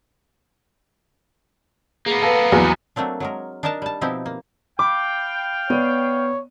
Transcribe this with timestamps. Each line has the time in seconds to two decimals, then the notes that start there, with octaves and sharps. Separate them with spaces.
2.06 A#3 B3 G#4
2.22 A4 B4 F5
2.52 A#1 E2 F#3
2.96 F#3 A3 A#3 C4 D4
3.20 F#3 G#3 A#4
3.63 D4 D#4 A#4 D#5 A5 A#5
3.82 G3 A5
4.01 B2 F3 C4 D#4 E4 G4
4.26 A#3
4.79 F5 G5 B5 D6
5.70 B3 C#5 D5 D#7